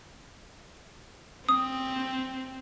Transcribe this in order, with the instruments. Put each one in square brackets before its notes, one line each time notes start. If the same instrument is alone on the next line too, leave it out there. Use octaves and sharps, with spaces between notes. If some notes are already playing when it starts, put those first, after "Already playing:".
[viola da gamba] C4 [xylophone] D#6